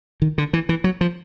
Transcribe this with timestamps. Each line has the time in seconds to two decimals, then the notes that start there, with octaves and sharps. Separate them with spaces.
0.22 D#3
0.38 D3
0.53 E3
0.69 E3
0.84 F#3
1.01 F3